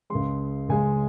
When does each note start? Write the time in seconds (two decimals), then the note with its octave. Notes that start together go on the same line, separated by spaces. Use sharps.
0.10 C#2 C#3 G#3 C6
0.69 C#2 C#3 G#3 G#5